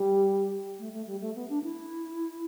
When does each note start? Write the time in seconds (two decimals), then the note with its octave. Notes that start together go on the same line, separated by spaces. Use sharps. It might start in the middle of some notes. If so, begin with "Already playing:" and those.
Already playing: G3
0.79 A3
0.92 A3
1.06 G3
1.21 A3
1.35 B3
1.49 D4
1.63 E4